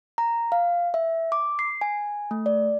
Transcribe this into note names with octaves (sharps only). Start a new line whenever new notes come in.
A#5
F5
E5
D6
C7
G#5
A3
D5